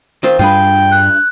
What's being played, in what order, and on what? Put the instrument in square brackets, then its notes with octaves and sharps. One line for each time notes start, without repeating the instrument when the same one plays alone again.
[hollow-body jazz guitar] D#3 C4 F4
[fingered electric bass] G2 G3 D4 [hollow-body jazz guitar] F4 G#4 B4 [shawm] G5
[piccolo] F#6